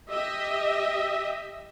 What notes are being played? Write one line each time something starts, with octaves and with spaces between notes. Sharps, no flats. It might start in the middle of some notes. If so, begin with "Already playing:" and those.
G4 D#5 E5